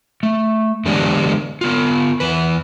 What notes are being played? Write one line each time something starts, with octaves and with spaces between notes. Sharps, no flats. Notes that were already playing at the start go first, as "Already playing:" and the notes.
A3
D3 E3 G#3 B3 D4 G4
B3 F4
E2 E3 B4